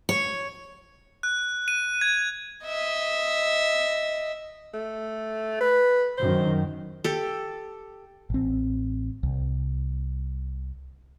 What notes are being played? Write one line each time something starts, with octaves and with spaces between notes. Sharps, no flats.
C#5
F#6
D#7
G#6
D#5 E5
A3
B4
F#2 D#3 C5
G4 A4
A1 C4
C2